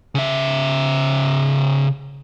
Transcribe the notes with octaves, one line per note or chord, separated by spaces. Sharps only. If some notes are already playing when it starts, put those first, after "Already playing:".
C#3 E5